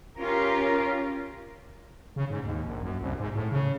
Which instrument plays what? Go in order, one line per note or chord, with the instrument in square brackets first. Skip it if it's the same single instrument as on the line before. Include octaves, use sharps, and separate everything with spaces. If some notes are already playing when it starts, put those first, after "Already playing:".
[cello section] C#4 F4 G4 A#4
[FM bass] C#3
G#2
D#2
A#1
F#2
C2
G#2
A2
C#3